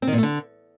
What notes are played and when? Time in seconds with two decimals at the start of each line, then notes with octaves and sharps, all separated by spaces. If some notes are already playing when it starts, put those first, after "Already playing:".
0.02 C4
0.07 D#3
0.13 A#2
0.18 A3
0.23 D3